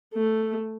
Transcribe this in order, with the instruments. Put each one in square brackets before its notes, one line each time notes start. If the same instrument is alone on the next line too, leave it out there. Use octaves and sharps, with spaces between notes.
[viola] A3